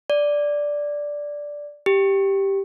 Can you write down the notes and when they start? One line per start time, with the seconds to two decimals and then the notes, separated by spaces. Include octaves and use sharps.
0.10 D5
1.86 G4